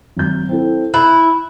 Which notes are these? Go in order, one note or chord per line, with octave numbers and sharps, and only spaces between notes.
G#1 F#3 G6
C4 E4 A4
E4 F#6